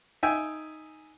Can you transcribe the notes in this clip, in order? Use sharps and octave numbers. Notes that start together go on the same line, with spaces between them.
D#4 E5 G5 G#5